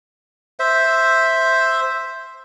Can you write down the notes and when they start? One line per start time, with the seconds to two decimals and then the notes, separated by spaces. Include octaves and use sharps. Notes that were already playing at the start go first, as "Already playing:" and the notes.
0.59 C5 E5